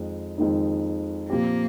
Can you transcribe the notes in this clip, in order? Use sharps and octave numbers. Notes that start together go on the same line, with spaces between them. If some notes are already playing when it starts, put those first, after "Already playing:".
Already playing: F2 D#3 G#3 D#4
F2 D#3 G#3 D#4
A#2 F3 A#3 C4 G4